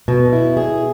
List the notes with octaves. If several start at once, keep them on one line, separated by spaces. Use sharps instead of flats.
B2
E4
G#4